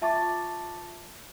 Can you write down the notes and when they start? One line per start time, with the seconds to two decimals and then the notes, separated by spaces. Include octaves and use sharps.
0.02 F4 E5 A5 C#6 D6 A6